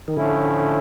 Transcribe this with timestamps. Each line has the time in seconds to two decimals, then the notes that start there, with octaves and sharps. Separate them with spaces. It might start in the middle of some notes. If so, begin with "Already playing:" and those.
0.08 D#3
0.16 A2 D3 F3 A3 C#4 E4